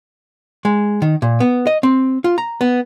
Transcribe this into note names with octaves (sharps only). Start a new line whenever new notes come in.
G#3
D#3
A#2
B3
D#5
C4
F4
A#5
B3